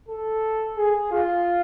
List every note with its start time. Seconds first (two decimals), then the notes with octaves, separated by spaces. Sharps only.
0.09 A4
0.77 G#4
1.12 F4